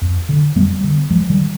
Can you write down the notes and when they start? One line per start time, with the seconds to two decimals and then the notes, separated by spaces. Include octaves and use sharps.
0.02 F2
0.29 D3
0.56 F2 G3 B3
0.84 D3
1.10 G#2 F3 G#3
1.30 D#3 G3